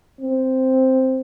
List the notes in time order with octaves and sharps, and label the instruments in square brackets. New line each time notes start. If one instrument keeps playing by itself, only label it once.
[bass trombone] C4